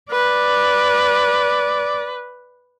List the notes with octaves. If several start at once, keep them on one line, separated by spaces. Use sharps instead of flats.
B4 D5